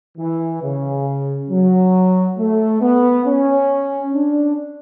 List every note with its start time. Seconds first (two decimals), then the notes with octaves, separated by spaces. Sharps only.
0.18 E3
0.62 C#3
1.50 F#3
2.38 A3
2.81 B3
3.26 C#4
4.14 D4